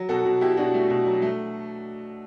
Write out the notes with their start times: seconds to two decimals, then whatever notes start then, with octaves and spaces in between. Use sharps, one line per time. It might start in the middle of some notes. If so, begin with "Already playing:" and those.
Already playing: F#3
0.09 B2 F#4 A4
0.25 B2
0.41 B2 E4 G4
0.57 B2 D4 F#4
0.74 A3
0.90 B2
1.06 F#3
1.22 A3